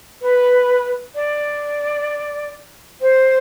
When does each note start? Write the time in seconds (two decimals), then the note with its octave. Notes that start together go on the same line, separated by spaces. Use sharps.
0.22 B4
1.15 D5
3.01 C5